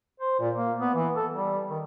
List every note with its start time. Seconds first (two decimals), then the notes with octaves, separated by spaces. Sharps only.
0.20 C5
0.40 A#2
0.56 A#3
0.80 B3
0.95 E3
1.16 A4
1.32 G3
1.70 D#3